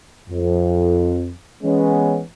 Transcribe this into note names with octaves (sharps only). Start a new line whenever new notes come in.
F2
E3 G#3 B3 C#4